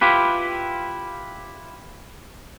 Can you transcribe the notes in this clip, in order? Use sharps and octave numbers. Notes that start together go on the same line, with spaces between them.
E4 F4 G4 B4